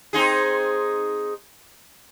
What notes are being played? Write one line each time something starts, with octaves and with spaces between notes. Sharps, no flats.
C4 D#4 G#4